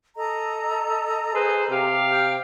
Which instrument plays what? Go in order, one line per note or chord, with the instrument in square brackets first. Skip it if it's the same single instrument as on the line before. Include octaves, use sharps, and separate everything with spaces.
[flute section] A4 D#5 A#5
[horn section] G#4 B4 C5
C3 G4 F5
[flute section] G5 F6